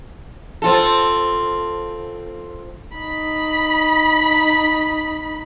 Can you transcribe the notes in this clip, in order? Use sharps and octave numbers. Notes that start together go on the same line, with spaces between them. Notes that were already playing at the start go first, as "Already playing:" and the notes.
C4 F4 A4
D#4 B5